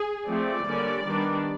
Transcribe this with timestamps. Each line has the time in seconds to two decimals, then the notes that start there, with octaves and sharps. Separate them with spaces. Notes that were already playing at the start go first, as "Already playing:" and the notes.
Already playing: G#4
0.28 F3 A3 C4 D5
0.66 D3 G3 A#3 C#4
1.04 D#3 G3 B3 D4